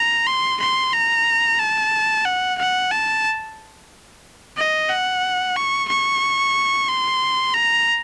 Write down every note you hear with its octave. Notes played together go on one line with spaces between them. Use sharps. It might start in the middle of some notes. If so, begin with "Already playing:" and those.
Already playing: A#5
C6
C6
A#5
A5
F#5
F#5
A5
D#5
F#5
C#6
C#6
C6
A#5